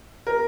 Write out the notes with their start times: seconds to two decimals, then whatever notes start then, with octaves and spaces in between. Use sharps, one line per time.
0.27 A#4